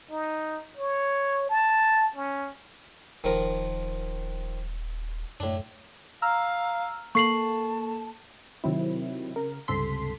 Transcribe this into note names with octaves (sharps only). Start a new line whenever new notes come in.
D#4
C#5
A5
C#4
D#1 D#3 F3 A#4
F#2 A2 D4
F5 A#5 E6 F6
A#3 A4 A5 C#6 C7 F#7
C3 D#3 F#3 C4 E4
C#3 A#4
C#2 G2 C3 A4 C6 B6